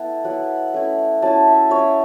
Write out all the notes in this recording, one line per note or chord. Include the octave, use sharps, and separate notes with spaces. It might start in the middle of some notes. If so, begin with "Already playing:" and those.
Already playing: A3 B3 E4 A5
F#3 B3 E4 F#5
A3 C#4 E4
F#3 C#4 E4 A5
E5
F#3 C#4 E4 C#5